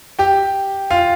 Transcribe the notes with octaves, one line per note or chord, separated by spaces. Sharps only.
G4 G5
F4 F5